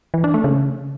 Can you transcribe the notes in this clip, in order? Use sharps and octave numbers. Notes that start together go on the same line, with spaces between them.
E3
D4
A3
C#3